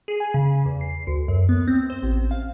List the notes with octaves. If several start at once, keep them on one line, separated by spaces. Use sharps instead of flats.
G#4
G#5
C#3
E2
C7
D2
F#2
B3
C4
C5
A1
F5